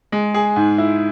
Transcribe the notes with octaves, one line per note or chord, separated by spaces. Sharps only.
G#3
G#4
G#2
E4